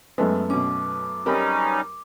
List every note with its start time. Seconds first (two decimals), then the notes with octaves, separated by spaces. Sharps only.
0.18 F#2 G#3 A3 B3
0.50 B2 C#4 D6
1.26 G3 C#4 D#4 G4 A#4 B5